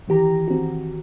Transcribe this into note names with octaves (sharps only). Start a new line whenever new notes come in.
D#3 E3 G4 A#5
C4 F#4